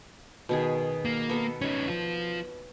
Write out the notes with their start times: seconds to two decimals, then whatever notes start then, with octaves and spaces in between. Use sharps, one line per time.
0.49 B2 D#3 G#4
1.05 A#3
1.29 B3 A4
1.61 C#4 D#4 C#5
1.87 F3 F4